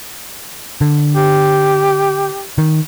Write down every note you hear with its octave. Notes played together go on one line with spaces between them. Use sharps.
D3
G4
D#3